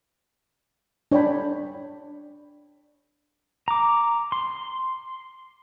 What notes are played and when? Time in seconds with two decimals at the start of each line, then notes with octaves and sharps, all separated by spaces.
1.11 D4 C#5 D5 G5 B5
3.68 A#5 D6
4.32 C6